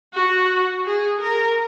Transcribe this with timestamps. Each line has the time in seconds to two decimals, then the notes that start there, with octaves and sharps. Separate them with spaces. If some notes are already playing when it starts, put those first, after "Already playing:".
0.14 F#4
0.85 G#4
1.21 A#4